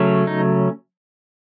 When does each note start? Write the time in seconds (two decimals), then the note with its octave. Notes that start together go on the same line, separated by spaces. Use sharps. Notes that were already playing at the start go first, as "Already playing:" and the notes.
Already playing: C#3 F#3 A3 C#4
0.27 D#4